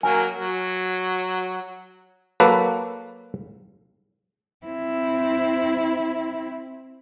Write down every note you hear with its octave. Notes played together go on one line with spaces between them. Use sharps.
F#3 A#3 A#4 G#5
F#3
F#3 A#3 A4 B4
C4 E4